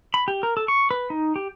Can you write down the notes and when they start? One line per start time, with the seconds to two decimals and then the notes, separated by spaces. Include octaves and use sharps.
0.14 B5
0.28 G4
0.43 A#4
0.57 A4
0.68 C#6
0.91 B4
1.10 D#4
1.36 G4